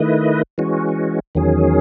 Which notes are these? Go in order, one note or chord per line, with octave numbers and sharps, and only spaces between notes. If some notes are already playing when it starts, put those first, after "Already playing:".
Already playing: D#3 A3 E4 B4 D#5
E3 G#3 C#4 F#4
E2 D#3 F#3 C#4 G#4